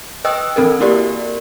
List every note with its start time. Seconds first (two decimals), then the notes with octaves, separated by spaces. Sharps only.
0.25 B4 D#5 G5 D#6 E6 F#6
0.56 E3 C4 A4 A#4
0.80 A#3 E4 F#4 G4 A#4 D5